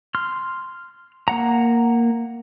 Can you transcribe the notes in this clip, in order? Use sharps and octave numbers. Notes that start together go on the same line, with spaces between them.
C6 F6
A#3 F#5 A#5